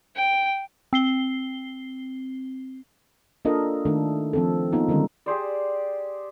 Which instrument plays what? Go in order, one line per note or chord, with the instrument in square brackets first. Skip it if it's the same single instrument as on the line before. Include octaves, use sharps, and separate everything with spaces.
[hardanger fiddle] G5
[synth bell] C4 C7 G7
[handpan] A#3 D4 F4 A4 A#4 D#5
D#3 A3 D4 A4
F3 C4 A4
A#3 B3 D#4 F4
D3 D#3 G3 G#3 C#4
[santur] G4 G#4 C5 D5